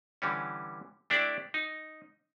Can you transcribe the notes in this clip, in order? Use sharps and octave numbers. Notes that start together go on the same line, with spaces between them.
D3 E3 G3 C#4
A3 D4 E4 G4 D5
D#4